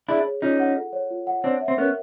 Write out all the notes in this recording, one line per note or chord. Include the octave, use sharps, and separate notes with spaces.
D4 E4 G#4
C#5
C#4 D#4 F4
F#5
A4
C#5
F4
F#5
C4 D4 C#5
E5
C4
B3 C#4 A#4